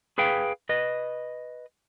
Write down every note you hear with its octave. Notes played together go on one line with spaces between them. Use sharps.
G#4 B4 F5 G5
B4 D#5